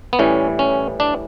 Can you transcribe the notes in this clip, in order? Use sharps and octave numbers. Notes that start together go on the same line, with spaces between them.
B3
A2 E3 G3 C#4
C#4
D4